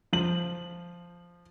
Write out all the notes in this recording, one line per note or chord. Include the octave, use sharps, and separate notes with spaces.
F3 F#7